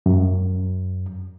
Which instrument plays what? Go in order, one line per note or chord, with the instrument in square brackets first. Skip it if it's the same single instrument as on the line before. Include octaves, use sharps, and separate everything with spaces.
[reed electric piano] F#2